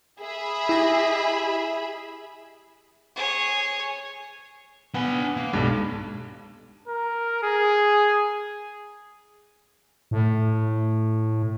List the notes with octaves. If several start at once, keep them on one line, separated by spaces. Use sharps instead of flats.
G#4 E5 B5
E4 G4 D#5
G#4 C#5
B3 D4 G#5
A#3
B1 G2 G#3
A#4
G#4
A2